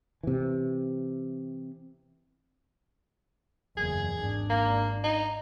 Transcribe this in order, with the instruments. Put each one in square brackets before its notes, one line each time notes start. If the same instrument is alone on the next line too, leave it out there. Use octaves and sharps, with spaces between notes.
[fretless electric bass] C3 E3
[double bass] F#1 E2 [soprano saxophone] G#4
[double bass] G#1 D4
[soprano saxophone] A#3
D#4